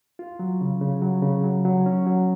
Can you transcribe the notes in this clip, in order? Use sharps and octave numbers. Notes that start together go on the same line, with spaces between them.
F4
F#3
C#3
C#3
F#3
C#3
F#3
F#3
C#4
F#3